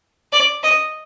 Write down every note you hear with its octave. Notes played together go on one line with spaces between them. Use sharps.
D5
D#5